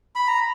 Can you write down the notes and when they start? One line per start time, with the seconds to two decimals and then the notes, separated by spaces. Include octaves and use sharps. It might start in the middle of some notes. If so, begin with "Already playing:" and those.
0.16 B5
0.28 A#5